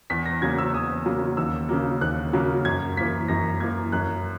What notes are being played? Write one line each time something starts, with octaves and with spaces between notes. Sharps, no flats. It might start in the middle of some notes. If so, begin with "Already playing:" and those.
E2 B6
A#6
C#3 F#3 A#3 G#6
E6
E2 D#6
C#3 F#3 A#3
D#2 E6
C#3 F#3 A#3
D#2 F#6
C#3 F#3 A#3
F#2 G#6
E3 A#3 B6
F#2 A#6
E3 A#3 G#6
F#2 F#6